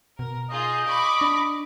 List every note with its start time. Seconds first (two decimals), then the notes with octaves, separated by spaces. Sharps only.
0.19 B2 A#4
0.50 F4 G#4 D#5 G6
0.86 B5 C#6 D6
1.21 D4